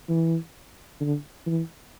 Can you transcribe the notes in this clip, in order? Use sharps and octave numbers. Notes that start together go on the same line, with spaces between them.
E3
D3
E3